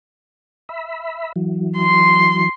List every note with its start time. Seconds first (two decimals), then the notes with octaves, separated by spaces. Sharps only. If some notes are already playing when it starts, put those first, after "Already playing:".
0.69 E5 B5
1.36 E3 F#3
1.78 C6